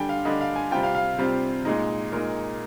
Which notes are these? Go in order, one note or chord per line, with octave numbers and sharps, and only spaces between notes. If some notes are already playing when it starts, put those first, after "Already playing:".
Already playing: D3 G3 D4 G5 G#5
F5
D3 G3 D4 D#5
F5
G#5
C3 G3 C4 F4 G5
F5
F5
C3 G3 C4 F4
A#2 G#3 D#4
A#2 G#3 D#4 A#4